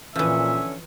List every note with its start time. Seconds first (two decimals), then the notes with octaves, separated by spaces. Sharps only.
0.16 A#2 D3 E3 F3 C#4 E5